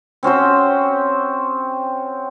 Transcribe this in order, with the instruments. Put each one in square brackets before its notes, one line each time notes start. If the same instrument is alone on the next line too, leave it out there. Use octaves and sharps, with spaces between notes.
[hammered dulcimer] C4 C#4 F#4 C5